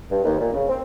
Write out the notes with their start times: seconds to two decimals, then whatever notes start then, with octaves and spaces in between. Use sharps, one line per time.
0.10 G2
0.24 D#2
0.39 A#2
0.53 C#3
0.69 C4